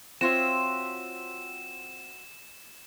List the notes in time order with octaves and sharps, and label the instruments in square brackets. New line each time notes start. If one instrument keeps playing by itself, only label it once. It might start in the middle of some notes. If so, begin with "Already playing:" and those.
[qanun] C4 F4 C#5 [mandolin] F#4 C5 E5 [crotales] E7